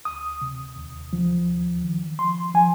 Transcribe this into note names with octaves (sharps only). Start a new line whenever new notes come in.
D2 D#6
C3
D#2
F3
D#2
D#3
F3 C6
F3 G#5